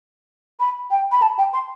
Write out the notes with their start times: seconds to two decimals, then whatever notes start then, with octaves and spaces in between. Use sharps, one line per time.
0.60 B5
0.91 G5
1.12 B5
1.22 A5
1.38 G5
1.53 C6